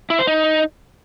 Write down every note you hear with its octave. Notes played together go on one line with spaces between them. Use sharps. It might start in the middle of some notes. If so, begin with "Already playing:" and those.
E4
C5
D#4